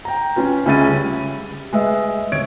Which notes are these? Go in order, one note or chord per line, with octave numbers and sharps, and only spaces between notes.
G5 A#5
C#4 F4 B4
C#2 C#4 E5 B5 A6 D#7
G3
G#3 B4 E5
D#1 C#5 G#6 D7